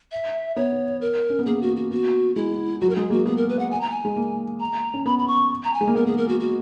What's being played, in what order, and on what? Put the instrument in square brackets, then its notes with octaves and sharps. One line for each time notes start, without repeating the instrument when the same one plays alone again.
[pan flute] E5
[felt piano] B3 [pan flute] C#5
[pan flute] A#4
[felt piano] C#4
B3
[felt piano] A#3 [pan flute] G#4
[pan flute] F#4
F#4
[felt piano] B3 [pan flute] F#4
[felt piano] G#3 [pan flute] E4
[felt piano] F#3 [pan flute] F#4
[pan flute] A#4
[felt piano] G#3 [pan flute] G#4
[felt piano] A#3 [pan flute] F#4
[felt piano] B3 [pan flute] G#4
[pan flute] A#4
B4
F#5
G#5
A#5
G#5
[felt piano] G#3
A#3
[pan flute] A#5
[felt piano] C#4
[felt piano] B3 [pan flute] B5
[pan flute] B5
C#6
A#5
G#5
[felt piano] G#3
A#3
[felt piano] B3 [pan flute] A#4
[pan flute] G#4
A#4
F#4
F#4